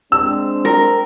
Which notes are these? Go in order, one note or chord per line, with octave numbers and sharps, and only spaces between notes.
G#3 C4 D4 E6
A#4